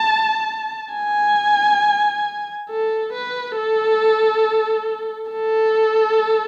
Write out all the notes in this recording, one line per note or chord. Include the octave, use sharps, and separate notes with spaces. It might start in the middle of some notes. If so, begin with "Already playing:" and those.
Already playing: A5
G#5
A4
B4
A4
A4